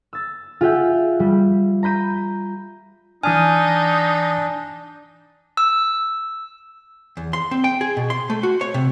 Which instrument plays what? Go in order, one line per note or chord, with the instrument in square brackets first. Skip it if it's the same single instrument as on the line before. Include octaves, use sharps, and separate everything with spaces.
[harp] E6 A6
F4 G4 G#4 E5 F#5 G5
G3
A#5 B5 G6 D#7
[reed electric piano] E3 D#6 F6 [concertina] D4 [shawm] D#4 [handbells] G#5
[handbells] E6
[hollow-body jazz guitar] E2
C6
C4
G5
G#4
B2
C6
A3
F#4
C#5
C3